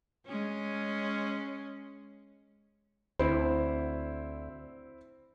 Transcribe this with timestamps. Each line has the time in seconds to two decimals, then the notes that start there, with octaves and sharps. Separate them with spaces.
0.26 G#3 C#4
3.19 D2 C4 E4 C5